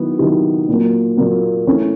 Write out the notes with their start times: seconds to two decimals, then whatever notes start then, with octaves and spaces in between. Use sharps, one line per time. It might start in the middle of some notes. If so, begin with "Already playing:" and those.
Already playing: D#3 F#3 B3 E4
0.18 D#3 F#3 B3 E4 G4
0.68 A#2 F#3 A#3
1.17 A#2 F#3 A#3
1.67 E3 A3 C#4